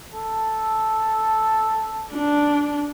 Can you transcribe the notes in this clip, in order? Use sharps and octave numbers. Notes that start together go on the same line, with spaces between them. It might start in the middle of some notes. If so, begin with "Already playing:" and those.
A4
D4